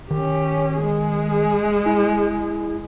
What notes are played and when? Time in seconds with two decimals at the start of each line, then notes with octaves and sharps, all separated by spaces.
0.11 D#3 C#4 G4
0.77 G#3 G#4
1.86 E4